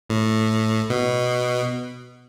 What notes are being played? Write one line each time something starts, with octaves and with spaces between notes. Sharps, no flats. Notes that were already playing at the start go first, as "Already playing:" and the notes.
A2
B2